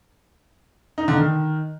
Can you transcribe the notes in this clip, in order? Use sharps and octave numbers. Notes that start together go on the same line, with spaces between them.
D#4
D3
D#3